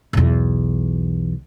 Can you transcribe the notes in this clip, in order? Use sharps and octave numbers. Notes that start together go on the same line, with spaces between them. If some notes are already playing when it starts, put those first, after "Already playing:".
B1 E2